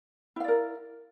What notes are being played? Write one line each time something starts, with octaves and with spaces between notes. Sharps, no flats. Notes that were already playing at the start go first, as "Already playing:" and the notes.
E4 A#4 D5 F5